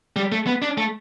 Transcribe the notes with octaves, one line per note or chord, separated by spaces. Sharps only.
G3
A3
B3
D4
A3